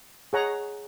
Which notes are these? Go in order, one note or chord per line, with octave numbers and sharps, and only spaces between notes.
G#4 C#5 F#5 A#5